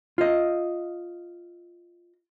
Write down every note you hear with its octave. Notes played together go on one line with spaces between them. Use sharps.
F4 D#5